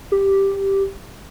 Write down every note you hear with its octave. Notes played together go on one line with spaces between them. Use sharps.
G4